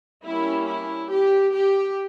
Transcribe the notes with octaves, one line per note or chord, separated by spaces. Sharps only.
G3 A#3 C#4 E4
E4
G4
G4